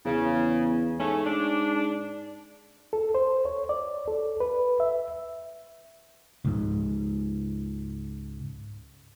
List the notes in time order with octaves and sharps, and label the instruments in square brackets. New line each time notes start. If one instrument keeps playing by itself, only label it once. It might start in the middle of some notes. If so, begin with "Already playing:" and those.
[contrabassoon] E2 [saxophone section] C#3
[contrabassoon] G#2 [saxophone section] A3 C#4
[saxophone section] D4
[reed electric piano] A4
C5
C#5
D5
A4
B4
E5
[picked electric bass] C#2 G#2